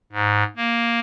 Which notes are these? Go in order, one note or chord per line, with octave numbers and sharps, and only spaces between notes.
G#2
A#3